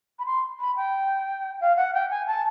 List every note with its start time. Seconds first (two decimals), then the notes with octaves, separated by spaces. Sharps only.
0.19 B5
0.26 C6
0.60 B5
0.76 G5
1.61 F5
1.77 F#5
1.94 G5
2.10 G#5
2.27 A5